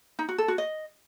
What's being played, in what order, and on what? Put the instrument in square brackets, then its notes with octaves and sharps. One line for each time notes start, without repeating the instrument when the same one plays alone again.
[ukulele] D#4
F#4
A4
F#4
D#5